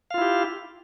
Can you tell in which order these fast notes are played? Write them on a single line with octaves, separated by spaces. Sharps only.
F5 F4 E4 G4